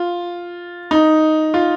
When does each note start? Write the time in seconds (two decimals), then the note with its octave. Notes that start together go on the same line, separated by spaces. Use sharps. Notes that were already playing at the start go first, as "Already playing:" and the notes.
Already playing: F4
0.91 D#4
1.54 F4